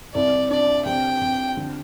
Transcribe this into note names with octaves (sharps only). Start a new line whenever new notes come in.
C2 D5
D4 D5
C3 G5
C3
D3